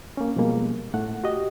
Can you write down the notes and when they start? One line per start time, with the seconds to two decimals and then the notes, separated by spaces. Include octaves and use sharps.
0.17 A#3 C#4
0.36 B2 F3 G3 G#3 A#3
0.94 A2 A3 F#5
1.24 F#4 G4 D#5